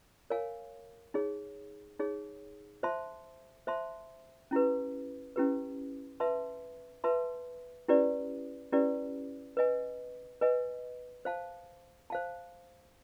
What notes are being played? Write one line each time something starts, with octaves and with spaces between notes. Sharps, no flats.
A#4 C#5 F5 G#5
D#4 G#4 C#5
D#4 G#4 C#5
C5 E5 A5 C6
C5 E5 A5 C6
C#4 E4 G4 B4
C#4 E4 G4 B4
B4 E5 A5 C6
B4 E5 A5 C6
C#4 E4 G4 B4 D5
C#4 E4 G4 B4 D5
B4 D#5 G#5
B4 D#5 G#5
C5 F5 A5
C5 F5 A5